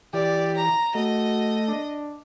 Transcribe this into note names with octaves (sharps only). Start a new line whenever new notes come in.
E3 G4 D5
A#5
A3 F#4 D#5
D4